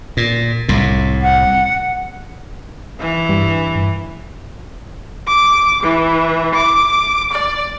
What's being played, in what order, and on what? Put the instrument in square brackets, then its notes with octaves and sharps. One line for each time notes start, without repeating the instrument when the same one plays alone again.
[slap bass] A#2
C2 A2
[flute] F#5
[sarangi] E3
[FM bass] G2
[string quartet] D6
E3
D6
D5